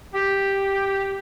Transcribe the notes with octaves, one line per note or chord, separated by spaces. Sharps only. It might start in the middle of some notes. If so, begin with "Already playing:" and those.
G4